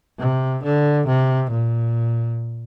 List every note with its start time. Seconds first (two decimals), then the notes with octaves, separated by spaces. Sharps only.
0.19 C3
0.63 D3
1.07 C3
1.51 A#2